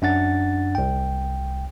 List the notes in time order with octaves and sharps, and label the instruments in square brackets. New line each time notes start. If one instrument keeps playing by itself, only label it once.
[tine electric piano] F#2 D4 F#5 A6
C2 G5